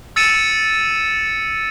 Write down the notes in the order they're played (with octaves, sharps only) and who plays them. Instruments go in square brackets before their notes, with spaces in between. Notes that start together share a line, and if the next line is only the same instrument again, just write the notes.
[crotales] E6 A6 C#7 D#7 E7